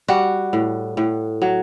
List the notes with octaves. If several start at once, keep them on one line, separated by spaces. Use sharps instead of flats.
G3 F#4
A2
A2
F#3